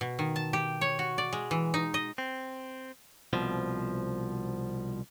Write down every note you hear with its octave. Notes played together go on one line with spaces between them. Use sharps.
B2
D#3
A5
G4
C#5
F#4
D5
G#3
E3
D#4
D#5
C4
C2 B2 F3